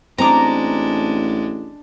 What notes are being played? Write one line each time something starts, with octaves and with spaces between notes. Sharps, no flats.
A1 G#3 C4 D4 A#5 D6